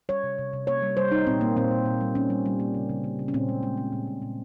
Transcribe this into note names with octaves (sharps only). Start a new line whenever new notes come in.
G3 C#5
C3
C3
C3
A#3 C#5
G3
G3 C5
G3 D#4
A#2 C4
A#2 A#3
A#2 C4
A#2
A#2
G3
A#3 C#4
G3
G3
A#3
C#3
C#3
A#3
C#3
C#4
A#2 C4
G#3
G#3
G#3
A#2
A#2
A#2